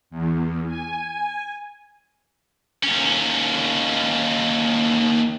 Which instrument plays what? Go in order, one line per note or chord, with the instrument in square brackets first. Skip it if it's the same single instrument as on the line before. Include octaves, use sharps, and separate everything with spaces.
[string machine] E2
G#5
[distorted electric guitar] D#2 C#4